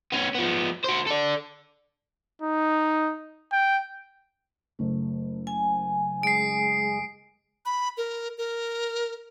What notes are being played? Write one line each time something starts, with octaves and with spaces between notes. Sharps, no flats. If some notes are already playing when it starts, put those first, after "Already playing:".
B3 C#4
F3 B3
F#4 C5
A4 D5
D#4
G5
F#1 A3
G#5
G#3 G#4 C7 D7
B5
A#4
A#4